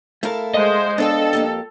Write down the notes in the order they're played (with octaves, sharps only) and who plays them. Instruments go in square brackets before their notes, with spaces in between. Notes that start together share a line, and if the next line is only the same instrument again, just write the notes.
[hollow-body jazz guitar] A3 A#4 [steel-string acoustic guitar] E4 A4 F5
[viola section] G#3 C5 [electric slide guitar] D#5
[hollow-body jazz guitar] B3 D4 [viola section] A4 [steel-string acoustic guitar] C5 F5 G5
[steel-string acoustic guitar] F2 A#3 G4